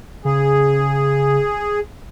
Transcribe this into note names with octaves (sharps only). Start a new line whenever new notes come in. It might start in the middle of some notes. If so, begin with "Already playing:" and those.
C#3 G#4